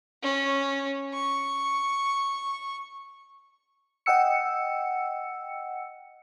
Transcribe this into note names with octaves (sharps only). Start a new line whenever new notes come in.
C#4
C#6
D#5 F#5 G5 E6 C#7